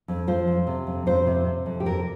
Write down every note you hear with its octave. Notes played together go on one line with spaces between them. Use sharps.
F2
F3 C5
F2
C3
F2
F2 C5
C3
C3
F2
G4
F2 A#4